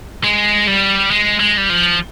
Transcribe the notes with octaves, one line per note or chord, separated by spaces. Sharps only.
G#3
G3
G#3
G#3
G3
F3